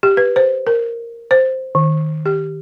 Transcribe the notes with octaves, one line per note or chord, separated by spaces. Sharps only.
G4
B4
C5
A#4
C5
D#3
G4